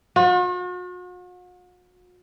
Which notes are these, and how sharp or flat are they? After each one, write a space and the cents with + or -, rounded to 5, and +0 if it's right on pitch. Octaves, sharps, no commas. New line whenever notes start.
F#4 -45